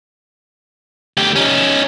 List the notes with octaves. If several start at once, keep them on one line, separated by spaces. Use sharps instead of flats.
D2 G4
C#4 D#4